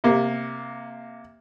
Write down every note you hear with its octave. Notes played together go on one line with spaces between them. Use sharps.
C3 A#3